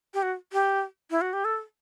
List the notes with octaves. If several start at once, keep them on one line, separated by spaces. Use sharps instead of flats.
G4
F#4
G4
E4
F#4
G4
A4